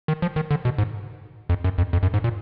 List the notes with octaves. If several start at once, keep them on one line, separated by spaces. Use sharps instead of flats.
D#3
F3
D#3
D3
B2
G#2
F2
F#2
F2
F2
F#2
G#2
A#2